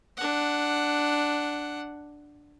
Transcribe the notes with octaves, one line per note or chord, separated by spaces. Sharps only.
D4 F#5